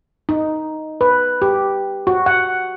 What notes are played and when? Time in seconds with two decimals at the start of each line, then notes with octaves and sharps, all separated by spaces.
0.29 D#4
1.01 B4
1.42 G4
2.07 F#4
2.26 F#5